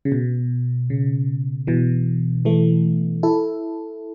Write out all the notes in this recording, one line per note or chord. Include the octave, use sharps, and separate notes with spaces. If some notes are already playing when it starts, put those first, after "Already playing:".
C#3
B2
C#3
B2 E3
E3 A3
E4 A4